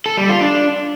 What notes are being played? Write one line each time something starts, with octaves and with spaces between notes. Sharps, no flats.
A4
G3
F4
D4